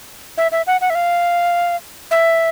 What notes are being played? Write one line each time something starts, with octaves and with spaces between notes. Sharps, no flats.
E5
E5
F#5
F#5
E5
F5
E5